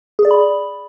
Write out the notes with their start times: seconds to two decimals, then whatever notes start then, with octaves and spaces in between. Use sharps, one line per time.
0.19 G#4
0.25 D5
0.31 B5